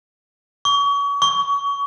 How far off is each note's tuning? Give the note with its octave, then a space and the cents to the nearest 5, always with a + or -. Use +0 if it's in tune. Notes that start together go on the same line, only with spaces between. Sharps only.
C#6 +35
C#6 +25